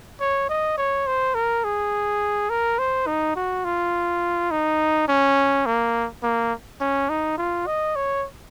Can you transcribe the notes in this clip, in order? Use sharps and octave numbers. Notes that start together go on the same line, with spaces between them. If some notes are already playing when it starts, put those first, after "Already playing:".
C#5
D#5
C#5
C5
A#4
G#4
A#4
C5
D#4
F#4
F4
D#4
C#4
A#3
A#3
C#4
D#4
F4
D#5
C#5